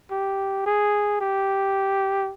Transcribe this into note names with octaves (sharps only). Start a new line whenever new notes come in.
G4
G#4
G4